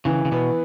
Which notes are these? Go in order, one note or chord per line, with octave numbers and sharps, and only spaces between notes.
C#3 E3
C#3
B2 B3